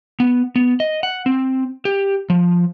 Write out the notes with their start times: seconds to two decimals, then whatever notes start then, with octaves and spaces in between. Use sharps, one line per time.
0.20 B3
0.56 B3
0.80 D#5
1.03 F#5
1.26 C4
1.85 G4
2.30 F3